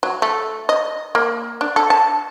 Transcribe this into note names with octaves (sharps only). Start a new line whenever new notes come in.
F#3
A3
D#5
A#3
D4
A4
A5